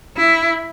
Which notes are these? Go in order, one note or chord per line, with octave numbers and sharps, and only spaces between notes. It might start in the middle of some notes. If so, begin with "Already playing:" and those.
E4